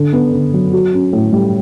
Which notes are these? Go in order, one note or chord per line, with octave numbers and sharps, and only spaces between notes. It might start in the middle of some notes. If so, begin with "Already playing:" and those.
Already playing: D3
B3
D3
F#3
F#4
C#4
A2
G3